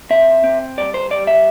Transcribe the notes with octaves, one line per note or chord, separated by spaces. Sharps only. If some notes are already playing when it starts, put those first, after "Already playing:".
C4 E5
C4
G2 D5
C5
G3 D5
E5